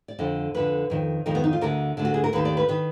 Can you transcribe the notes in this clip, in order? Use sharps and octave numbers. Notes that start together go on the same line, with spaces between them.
D5
F2 D3 D#5
F2 D3 B4
F2 D#3
F2 D#3 A#4
B3
D#4
F4
D2 D3 A#4
D2 D3
F#4
G#4
A#4
D#2 D#3 B4
D5
B4
D#3 B4